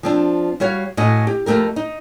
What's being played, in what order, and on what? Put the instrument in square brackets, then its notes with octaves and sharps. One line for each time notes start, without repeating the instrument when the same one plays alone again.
[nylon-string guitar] F3 C4 D4
G3 F#4 C#5 F5
A2 C#4 F#4 D#5
G4
F2 D#3 A3 G4 A#4
D#4